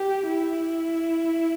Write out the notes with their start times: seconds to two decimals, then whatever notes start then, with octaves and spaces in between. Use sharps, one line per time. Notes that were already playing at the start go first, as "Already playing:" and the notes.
Already playing: G4
0.27 E4